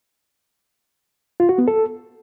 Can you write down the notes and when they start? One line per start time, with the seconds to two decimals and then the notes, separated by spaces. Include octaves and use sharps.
1.40 F4
1.49 F#4
1.58 B3
1.68 A4